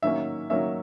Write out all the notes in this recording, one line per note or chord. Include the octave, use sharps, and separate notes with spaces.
D#3 F#3 A#3 C#4 E5
D#3 F#3 A#3 C#4 E5